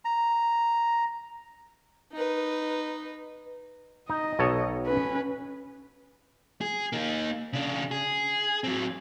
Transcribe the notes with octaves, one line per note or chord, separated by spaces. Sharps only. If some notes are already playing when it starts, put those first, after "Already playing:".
A#5
D#4 B4
D#4 D#5
B1 A4 C#5
C#4 B4
G#4
A#3 D#4
C#3 D4
G#4
F#3 C4